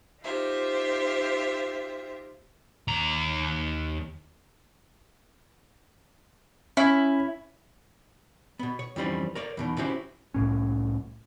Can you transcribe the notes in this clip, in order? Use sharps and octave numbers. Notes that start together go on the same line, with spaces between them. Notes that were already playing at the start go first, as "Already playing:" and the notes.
D#4 F4 G4 C5 E5
D#2 A#5
C#4 E4
B2 B3
C#5
F2 D#3 E3 G3 C#4 C5
A#4 C#5 D5
E2 B2 D#3
C#4 E4 F#4 G4 C5
C2 A2 C#4